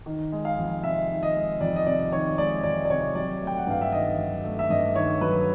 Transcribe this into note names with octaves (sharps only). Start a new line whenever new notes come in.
D#3
G#3
F5
F2
C3 E5
D#3
D#5
G#3
F2 D5
D#5
C3 D5
D#3 C#5
G#3 D5
F2 D5
D5
C3 C#5
F#3 D5
A3
G5
F#5
G2 F5
E5
D#3 D#5
F#3
A3
E5
G2 D#5
D#3 C#5
F#3 B4